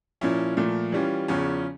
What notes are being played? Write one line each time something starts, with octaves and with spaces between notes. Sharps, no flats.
A#2 F3 C#4 E4
A#2 F3 A3
E3 G3 C#4 F4
E2 C#3 F3 C#4